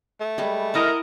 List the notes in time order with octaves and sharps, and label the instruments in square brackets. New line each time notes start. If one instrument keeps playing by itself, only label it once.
[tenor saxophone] A3
[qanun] G3 G#3 B4
[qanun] E4 F#5 A5 [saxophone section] A#4 D#5